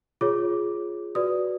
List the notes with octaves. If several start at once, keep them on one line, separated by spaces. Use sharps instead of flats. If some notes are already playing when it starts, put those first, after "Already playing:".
F4 G#4 C#5 D6
F#4 B4 D5 D#6